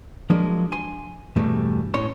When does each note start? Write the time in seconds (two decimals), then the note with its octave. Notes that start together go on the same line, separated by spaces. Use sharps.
0.30 F3 F#3 G#3 A#3 D4
0.72 G#5 C6
1.36 E2 G2 B2 G3 A3
1.94 A2 C#4 C#5 C6